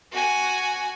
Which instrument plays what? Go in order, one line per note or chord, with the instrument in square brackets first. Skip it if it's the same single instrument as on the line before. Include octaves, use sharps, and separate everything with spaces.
[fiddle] F#4 G#5